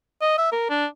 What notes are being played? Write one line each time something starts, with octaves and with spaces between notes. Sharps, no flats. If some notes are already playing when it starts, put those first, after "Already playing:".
D#5
E5
A#4
D4